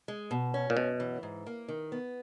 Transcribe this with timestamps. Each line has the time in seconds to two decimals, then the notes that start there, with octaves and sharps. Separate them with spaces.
0.08 G#3
0.31 B2
0.54 C#4
0.70 A#2
0.76 F#2 B2
1.00 E3
1.23 G#2
1.46 A#3
1.68 D#3
1.92 B3